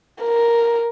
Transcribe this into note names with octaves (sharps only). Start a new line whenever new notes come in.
A#4